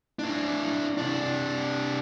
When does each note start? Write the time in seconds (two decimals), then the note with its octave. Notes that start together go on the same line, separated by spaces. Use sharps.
0.19 D4 E4
0.98 C3 D4